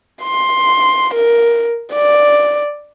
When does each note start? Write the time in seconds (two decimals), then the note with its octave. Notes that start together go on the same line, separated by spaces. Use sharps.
0.23 C6
1.13 A#4
1.93 D5